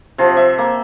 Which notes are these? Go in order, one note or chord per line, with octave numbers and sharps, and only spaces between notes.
C3 F3
E5
A#3